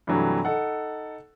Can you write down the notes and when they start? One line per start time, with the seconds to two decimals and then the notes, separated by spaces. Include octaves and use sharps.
0.07 G2 C3 E3 F#3 A3
0.45 D#4 A4 F#5